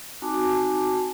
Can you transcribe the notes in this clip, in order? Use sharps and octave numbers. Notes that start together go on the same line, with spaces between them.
C4 D#4 F#4 G#5 A5 D6